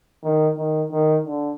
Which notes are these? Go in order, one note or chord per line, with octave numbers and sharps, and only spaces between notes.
D#3
D#3
D#3
D3